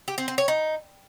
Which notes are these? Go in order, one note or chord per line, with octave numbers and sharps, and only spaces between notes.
G4
C4
C4
C#5
D#4